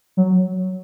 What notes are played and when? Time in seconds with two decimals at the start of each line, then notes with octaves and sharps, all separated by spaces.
0.17 F#3